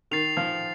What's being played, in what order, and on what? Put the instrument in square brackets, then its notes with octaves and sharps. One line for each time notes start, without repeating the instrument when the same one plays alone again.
[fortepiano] D#3 [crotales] A6 C7 F7
[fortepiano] F3